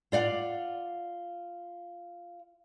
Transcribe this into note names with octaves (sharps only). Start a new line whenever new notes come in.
F4 D5 F5 F#5